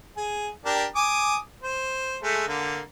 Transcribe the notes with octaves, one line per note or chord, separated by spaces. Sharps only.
G#4
D4 G4 A#4
G#5 D6 D#6
C5
G#3 A3
D3 A#3